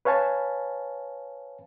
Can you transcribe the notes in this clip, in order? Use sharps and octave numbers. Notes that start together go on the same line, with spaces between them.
B4 C#5 F5 G#5 A5 B5